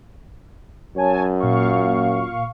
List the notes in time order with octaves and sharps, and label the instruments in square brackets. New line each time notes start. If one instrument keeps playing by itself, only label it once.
[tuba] F#2 [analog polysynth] C#5 G#5 A5
[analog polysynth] A#2 F5 C#6